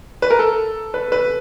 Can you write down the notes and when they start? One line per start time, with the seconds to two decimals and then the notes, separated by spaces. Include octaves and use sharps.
0.22 B4
0.30 A#4
0.39 A4
0.94 B4
1.12 B4